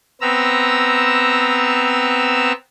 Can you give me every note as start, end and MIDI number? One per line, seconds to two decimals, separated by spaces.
0.21 2.52 59
0.21 2.52 60
0.21 2.52 82
0.21 2.52 88